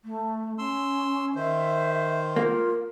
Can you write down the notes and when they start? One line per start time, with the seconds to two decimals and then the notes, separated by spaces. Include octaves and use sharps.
0.05 A3
0.58 C#4 C6 E6
1.36 D#3 C5 E5
2.36 A#3 F4